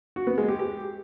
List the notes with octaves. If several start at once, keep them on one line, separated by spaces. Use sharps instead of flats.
F#4
B3
G#3
G4
G4